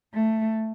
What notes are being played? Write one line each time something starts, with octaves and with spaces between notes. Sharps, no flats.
A3